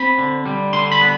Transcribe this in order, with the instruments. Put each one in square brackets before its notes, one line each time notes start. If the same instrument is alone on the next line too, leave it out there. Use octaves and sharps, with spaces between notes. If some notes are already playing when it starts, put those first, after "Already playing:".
Already playing: [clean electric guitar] C4 B5
D3
G3
D3 C6
B5
B3